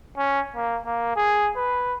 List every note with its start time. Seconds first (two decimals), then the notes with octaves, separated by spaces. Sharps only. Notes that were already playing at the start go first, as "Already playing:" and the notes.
0.18 C#4
0.56 A#3
0.85 A#3
1.16 G#4
1.56 B4